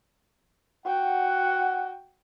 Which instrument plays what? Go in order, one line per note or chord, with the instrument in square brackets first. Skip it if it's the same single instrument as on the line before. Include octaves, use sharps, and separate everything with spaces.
[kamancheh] F#4 G5 [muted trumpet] F#5